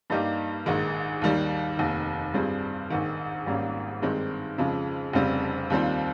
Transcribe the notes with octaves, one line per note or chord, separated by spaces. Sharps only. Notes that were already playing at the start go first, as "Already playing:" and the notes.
G2 G3 A#3 D#4 G4
A#1 G#2 D#3 G#3
D#2 D#3 G3
F1 D#2 D#3
G2 G3 C4 F4 G#4
A#1 G#2 D#3
G#1 G#2 G3 A#3 C#4
G2 D#3 G#3 C4
F2 C#3 F3 G#3
F1 F2 C#3 G3 C4
D#2 D#3 G3 C4 F4